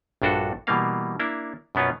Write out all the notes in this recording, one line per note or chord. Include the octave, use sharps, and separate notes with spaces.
A#1 G2 D4 F#4 A4
B2 E3 G3 A#3 F5
A#3 D4 E4
F#2 B2 B3 C#4 F4